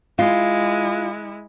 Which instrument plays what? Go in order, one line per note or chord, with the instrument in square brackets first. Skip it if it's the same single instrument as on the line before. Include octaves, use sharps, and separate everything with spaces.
[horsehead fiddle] G#3 E4 [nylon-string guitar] F4